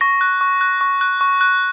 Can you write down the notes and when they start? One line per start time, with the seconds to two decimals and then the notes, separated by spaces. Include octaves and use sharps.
0.01 C#6 A#6
0.21 F#6
0.41 C#6
0.61 F#6
0.81 C#6
1.01 F#6
1.21 C#6
1.41 F#6